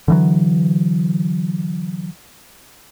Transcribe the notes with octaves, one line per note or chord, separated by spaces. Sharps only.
D3 E3 F#3